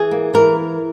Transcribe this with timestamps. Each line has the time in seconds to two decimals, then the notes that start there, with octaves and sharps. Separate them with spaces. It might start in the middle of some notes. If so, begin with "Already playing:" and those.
Already playing: E3 G#4
0.11 A#3
0.34 E3 A#4